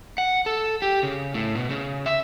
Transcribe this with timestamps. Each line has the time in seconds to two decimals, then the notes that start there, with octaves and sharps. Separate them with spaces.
0.18 F#5
0.46 A4
0.82 G4
1.03 C#3
1.34 A2
1.55 B2
1.70 C#3
2.06 E5